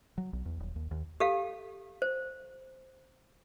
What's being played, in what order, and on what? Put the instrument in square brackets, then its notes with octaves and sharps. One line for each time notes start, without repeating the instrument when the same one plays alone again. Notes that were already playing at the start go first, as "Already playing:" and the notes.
[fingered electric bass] F#3
B1
E2
D#1
D#2
D#2
[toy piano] G4 A4 F5
C5